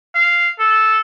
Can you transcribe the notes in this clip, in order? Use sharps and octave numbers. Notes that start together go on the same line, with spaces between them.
F5
A4